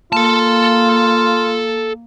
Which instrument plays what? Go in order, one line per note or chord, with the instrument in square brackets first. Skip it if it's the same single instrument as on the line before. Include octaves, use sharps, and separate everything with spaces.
[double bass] A#3 [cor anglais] F4 [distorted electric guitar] A4 A5